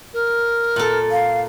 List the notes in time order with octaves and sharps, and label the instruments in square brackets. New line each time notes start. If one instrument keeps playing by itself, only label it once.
[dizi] A#4
[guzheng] A#2 A4
[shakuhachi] F5